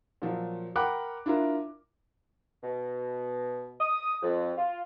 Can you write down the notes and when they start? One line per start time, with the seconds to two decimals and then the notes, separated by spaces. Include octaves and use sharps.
0.22 A#2 F3 F#3
0.76 A#4 F#5 G5 B5 D6 F#6
1.26 D4 E4 F4 A#4
2.62 B2
3.79 D#6
4.22 F2
4.58 F4